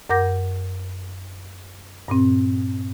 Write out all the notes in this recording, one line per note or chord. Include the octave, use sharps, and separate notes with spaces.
F#2 A#4 F#5 D6 G6 A#6
G2 A#2 C4